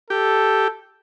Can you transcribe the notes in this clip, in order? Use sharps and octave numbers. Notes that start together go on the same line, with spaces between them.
G4 A4